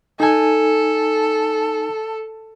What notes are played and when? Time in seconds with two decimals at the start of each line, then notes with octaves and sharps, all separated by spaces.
0.20 D#4 A4 G#5